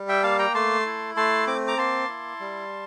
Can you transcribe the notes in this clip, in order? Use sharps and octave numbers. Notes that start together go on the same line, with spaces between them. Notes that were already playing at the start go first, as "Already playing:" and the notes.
Already playing: G3
E5 G5
A#3 F5 A5
G5 A#5
A3 A5 C6
E4
A3 A5 C6
C4 D6
A#5 D6
A#3 A5 C6
E4
G3